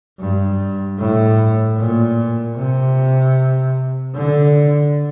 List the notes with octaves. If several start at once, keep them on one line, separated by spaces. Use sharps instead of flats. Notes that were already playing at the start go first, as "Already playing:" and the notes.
G2
A2
A#2
C3
D3